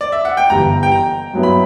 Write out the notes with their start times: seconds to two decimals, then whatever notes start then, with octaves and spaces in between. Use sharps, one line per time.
0.01 D5
0.12 E5
0.25 F#5
0.37 G5
0.50 G1 G2 E3 G3 A#5
0.83 G5
0.92 A#5
1.33 G2 F#3 B3 E4
1.43 B5